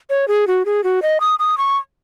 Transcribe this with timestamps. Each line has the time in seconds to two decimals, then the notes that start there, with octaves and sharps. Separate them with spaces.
0.10 C#5
0.28 G#4
0.47 F#4
0.65 G#4
0.84 F#4
1.02 D#5
1.20 D#6
1.39 D#6
1.58 C#6